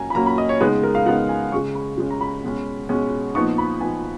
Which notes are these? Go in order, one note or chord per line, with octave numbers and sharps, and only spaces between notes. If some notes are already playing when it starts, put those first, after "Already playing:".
Already playing: A#2 F#3 A#3 C#4 G#5 A#5
B5
A#2 F#3 A#3 C#4 A#5
B5
D#5
C#5
C#3 G#3 B3 D#4 B4
A#4
F5
C#3 G#3 B3 D#4 F#5
G#5
C#3 G#3 C#4 C#6
B5
C#3 G#3 C#4
A#5
B5
B2 G#3 C#4
B2 G#3 C#4
A#2 F3 B3 D#4 C#6
B5
A#2 F3 B3 D#4 G#5